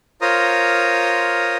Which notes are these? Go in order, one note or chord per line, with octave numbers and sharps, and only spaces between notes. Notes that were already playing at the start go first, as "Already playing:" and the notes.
F4 A#4 C5 C#5 A#5 D#6